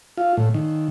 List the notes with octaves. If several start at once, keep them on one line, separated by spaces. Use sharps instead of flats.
F4
A2
D#3